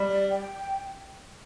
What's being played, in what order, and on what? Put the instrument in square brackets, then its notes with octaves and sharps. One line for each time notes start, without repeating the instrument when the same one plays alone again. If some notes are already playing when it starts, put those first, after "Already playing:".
Already playing: [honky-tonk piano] G3
[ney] D5
G5